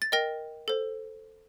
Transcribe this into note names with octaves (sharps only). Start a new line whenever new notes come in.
A6
A#4 D#5 G5 A#6
A4 C5